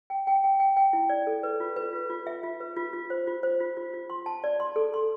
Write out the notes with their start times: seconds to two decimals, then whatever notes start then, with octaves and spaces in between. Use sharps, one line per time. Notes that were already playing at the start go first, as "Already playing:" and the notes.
0.10 G5
0.27 G5
0.44 G5
0.60 G5
0.77 G5
0.93 E4
1.09 D5
1.27 A4
1.43 B4
1.60 F4
1.76 B4
1.93 F4
2.10 F4
2.27 E5
2.43 F4
2.60 B4
2.76 F4
2.93 F4
3.10 C5
3.27 F4
3.43 C5
3.60 F4
3.77 F4
3.94 F4
4.10 C6
4.26 A5
4.44 D5
4.60 C6
4.76 A4
4.94 C6